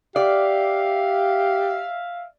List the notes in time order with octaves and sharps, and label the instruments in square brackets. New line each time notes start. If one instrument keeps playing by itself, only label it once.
[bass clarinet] G4 [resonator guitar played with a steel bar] D5 [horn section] E5 F5